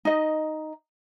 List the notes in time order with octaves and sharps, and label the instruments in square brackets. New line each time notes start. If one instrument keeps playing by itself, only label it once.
[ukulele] D#4 D#5